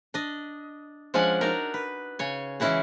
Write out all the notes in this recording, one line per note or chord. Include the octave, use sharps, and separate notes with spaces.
D4 D#5
F3 G#3 C#4 D4 F#5 G#5
D4 D#4 F#4 A#4
B4
C#3 C#5 G#5
E3 G#3 C#4 E4 F#4 G#4